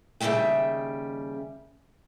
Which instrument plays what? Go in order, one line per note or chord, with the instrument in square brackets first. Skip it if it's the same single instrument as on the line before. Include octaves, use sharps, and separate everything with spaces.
[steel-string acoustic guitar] D#2 C#3 G3 G#3 E5 G5